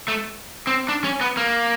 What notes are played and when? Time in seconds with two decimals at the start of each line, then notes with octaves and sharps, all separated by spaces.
0.08 A3
0.67 C4
0.89 D4
1.04 C#4
1.21 B3
1.37 A#3